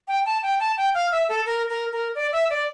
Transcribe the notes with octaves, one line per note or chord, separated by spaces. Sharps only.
G5
A5
G5
A5
G5
F5
E5
A4
A#4
A#4
A#4
D5
E5
D5